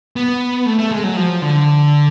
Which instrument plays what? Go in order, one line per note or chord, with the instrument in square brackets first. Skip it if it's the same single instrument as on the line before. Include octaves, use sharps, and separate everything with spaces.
[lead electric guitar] B3
A3
A3
G#3
F#3
F3
D3